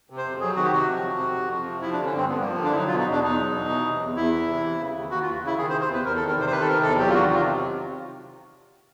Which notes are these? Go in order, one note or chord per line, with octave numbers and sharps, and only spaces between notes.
C3
C5
F2
F#3 G#4
D#3 F#4
G4
C3 F#4
F3
C3
F2
F2
F3
C3
F3 E4
D4
D3
C#4
G2 C4
G2 B3
A#3
F3
A#3
D3 D4
E4
F#3 D#4
F4
B2
D#4
E2 D4
E2 D#4
F#3
B2
E3
C3
E2
E2 E4
E3
C3
E3
C#3
D#2
D#2 F#4
F4
E3
C#3 E4
D#3 G#4
C5
C3
C5
E2 B4
E2 A#4
A4
D#3
A#4
C3 C5
C5
D#3 B4
A4
C3 A#4
E2 A4
F#3 G4
F4
D#3 F#4
C3 F4